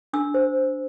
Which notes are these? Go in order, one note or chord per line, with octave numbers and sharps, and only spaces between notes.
D4 E6
C5